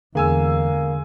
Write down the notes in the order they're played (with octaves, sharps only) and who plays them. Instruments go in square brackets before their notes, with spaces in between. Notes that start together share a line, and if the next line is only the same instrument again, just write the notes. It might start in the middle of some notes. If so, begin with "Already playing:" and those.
[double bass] E2 [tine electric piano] D3 [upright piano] G#3 G#5 E6 [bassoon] A#3